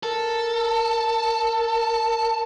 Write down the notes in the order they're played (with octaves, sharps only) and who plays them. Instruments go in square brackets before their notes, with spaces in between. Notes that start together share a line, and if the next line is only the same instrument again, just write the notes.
[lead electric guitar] A4 [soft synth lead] A#4